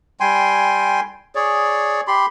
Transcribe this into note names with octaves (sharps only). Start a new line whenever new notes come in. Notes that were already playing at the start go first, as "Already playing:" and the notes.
G3 G5 G#5 C6
G#4 C#5 D5
G4 B5 C6